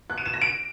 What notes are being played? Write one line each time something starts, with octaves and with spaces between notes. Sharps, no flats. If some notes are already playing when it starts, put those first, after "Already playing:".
F#6
D#7
E7
A#6
D7